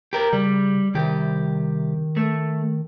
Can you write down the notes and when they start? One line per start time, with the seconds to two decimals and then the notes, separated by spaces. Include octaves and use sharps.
0.13 G4 A#4
0.33 C#3 G3
0.95 C2 D#3 G4
2.17 A3